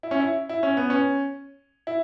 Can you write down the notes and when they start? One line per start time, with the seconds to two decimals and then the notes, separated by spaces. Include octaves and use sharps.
0.03 E4
0.11 C#4
0.20 E4
0.49 E4
0.63 C#4
0.77 B3
0.90 C#4
1.87 E4